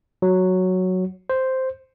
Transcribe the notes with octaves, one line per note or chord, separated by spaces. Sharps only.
F#3
C5